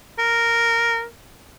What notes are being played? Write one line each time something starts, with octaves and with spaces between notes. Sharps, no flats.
A#4